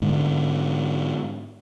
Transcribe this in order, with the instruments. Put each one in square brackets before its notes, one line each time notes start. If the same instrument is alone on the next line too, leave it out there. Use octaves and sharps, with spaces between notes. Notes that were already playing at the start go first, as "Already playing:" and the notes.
[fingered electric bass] G#2 D3